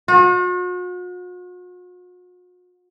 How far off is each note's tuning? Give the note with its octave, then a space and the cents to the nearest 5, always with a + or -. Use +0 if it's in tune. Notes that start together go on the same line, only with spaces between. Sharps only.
F#4 -45